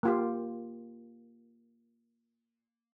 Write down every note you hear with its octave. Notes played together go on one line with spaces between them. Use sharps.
A#3 F4 G4